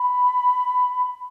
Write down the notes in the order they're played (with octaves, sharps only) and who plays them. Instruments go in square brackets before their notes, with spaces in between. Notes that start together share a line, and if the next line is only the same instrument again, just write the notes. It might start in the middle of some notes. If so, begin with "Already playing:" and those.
Already playing: [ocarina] B5